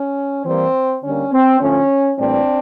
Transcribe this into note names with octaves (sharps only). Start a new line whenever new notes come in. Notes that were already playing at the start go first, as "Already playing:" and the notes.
Already playing: C#4
E3 G3 A#3 C4
D3 G3 A#3 C#4
C4
D3 F3 A3 C#4
A2 E3 G3 A#3 C4 D4